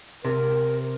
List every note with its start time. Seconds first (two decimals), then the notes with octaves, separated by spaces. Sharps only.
0.25 C3 A#4